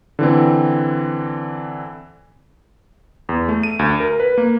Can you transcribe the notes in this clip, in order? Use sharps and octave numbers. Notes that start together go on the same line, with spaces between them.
D3 E3 C4
E2
A3
D#7
D2
A#4
B4
A#3